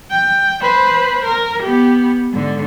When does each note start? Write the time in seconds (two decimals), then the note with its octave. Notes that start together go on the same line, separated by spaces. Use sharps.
0.11 G5
0.62 B4 C5
1.26 A#4
1.63 B3 G4
2.33 G#2 D3